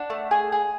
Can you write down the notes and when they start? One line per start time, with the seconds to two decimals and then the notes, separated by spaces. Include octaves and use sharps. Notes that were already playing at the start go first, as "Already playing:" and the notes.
Already playing: D4 F#5
0.10 A3
0.31 G#4
0.52 G#4